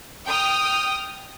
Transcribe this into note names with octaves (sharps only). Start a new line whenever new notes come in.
G5 D#6 F6